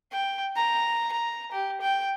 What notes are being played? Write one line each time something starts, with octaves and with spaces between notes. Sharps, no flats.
G5
A#5
A#5
G4
G5